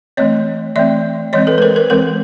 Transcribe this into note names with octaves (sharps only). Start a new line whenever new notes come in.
E3 A3 C4 C#5 D#5
E3 A3 C4 D5 E5
E3 G#3 C4 C#5 D#5
A4 B4
B4
A#4 C5
A#4 C5
E3 G#3 C4 A#4 C5